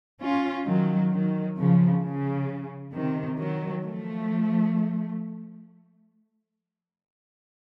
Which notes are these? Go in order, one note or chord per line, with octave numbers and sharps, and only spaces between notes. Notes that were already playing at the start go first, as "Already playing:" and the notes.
C#4 F4
D#3 F#3
D#3 F#3
C#3 F3
C#3
C3 D#3
D#3 F#3
F3 A3